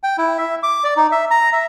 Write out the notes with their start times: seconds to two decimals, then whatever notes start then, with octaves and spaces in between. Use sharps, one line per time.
0.03 G5
0.18 E4
0.38 E5
0.63 D6
0.84 D5
0.97 D#4
1.12 E5
1.31 A#5
1.53 E5